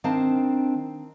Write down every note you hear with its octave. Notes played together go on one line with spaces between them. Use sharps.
D#3 C4 D4 F5 A5